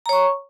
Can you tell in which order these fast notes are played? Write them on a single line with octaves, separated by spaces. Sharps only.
A#5 C#5 C#6